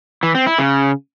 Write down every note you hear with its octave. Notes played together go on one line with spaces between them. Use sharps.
E3
C4
E4
C#3